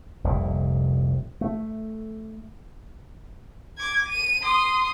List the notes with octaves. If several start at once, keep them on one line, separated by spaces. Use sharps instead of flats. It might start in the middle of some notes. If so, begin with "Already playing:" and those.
F1 C2 A#2
A3
D6 G#6
D#7
C6 D#6